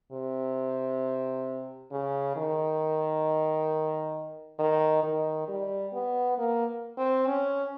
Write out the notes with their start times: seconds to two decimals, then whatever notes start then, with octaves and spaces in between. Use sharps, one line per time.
0.12 C3
1.91 C#3
2.36 D#3
4.59 D#3
5.03 D#3
5.48 G3
5.93 B3
6.38 A#3
6.97 C4
7.27 C#4